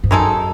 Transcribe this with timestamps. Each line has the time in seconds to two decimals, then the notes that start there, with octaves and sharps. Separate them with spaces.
0.04 G#2
0.11 F#2 D#3 G#3 D#4 A4